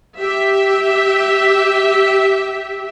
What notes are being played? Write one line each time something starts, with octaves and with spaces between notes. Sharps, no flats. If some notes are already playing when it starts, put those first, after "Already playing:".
G4 E5